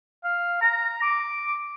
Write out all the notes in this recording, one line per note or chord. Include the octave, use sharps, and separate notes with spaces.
F5
A#5
D6